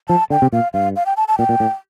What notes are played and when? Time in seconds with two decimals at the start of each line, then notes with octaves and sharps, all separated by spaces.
0.09 F3 A5
0.30 D3 G5
0.42 C3
0.52 A#2 F5
0.73 G2 F5
0.96 F5
1.06 G5
1.17 A5
1.28 A5
1.39 A#2 G5
1.49 A#2
1.60 A2